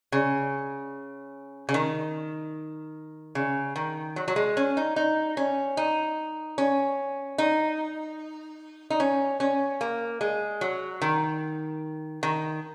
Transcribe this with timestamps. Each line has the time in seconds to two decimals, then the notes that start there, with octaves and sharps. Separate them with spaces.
0.12 C#3
1.69 C#3
1.74 D#3
3.35 C#3
3.76 D#3
4.16 F#3
4.28 F#3
4.36 G#3
4.57 C#4
4.77 D#4
4.96 D#4
5.37 C#4
5.77 D#4
6.58 C#4
7.38 D#4
8.90 D#4
9.00 C#4
9.40 C#4
9.81 A#3
10.21 G#3
10.61 F#3
11.02 D#3
12.23 D#3